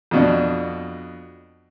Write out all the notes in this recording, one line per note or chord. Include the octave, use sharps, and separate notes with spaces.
F2 B2 D4